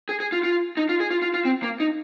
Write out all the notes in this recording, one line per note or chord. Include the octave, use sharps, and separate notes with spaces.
G#4
G#4
F4
F4
D#4
F4
G#4
F4
F4
F4
C4
A#3
D#4